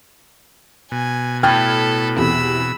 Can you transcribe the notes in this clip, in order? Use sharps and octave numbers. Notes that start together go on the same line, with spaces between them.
B2 G#5
A2 A4 G5 B5 F6 F#6 G#6
E2 C3 B5 E6